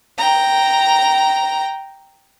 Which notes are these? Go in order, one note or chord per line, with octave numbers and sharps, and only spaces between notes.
G5 A#5